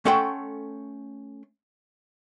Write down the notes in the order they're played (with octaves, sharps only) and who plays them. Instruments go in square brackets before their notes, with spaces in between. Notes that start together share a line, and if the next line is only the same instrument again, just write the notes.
[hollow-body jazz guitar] A3 C#4 A4 F#5 G5 C6